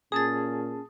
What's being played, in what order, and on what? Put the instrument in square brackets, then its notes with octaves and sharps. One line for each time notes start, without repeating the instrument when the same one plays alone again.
[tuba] A#2 [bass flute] C#4 [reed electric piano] G#4 A5 [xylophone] D#6 A6